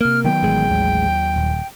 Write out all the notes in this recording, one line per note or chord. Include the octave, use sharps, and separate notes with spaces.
C3 A#3 F6
D#3 F#3 B3 G5
A1 G#3
D#2 F#3
D#1